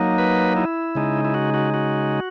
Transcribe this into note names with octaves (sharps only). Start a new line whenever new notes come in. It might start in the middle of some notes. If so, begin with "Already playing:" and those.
Already playing: F#3 A#3 D#4
B4
E4
C#3 G#3 D#4
E4
F#4
F#4
F#4